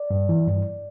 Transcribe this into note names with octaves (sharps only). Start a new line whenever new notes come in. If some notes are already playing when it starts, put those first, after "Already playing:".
Already playing: D5
G2
E3
G2